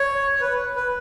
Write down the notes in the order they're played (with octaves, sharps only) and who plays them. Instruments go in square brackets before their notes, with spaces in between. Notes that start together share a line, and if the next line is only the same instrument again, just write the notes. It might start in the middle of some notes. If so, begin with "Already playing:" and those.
Already playing: [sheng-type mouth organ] C#5
C#5
B4
B4